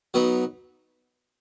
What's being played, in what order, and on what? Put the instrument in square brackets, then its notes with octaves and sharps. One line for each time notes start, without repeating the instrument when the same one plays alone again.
[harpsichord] F#3 B3 D#4